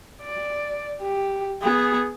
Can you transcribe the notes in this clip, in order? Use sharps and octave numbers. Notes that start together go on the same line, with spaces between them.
D5
G4
B3 G#4